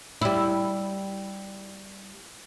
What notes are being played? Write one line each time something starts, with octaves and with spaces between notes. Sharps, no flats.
G3 E4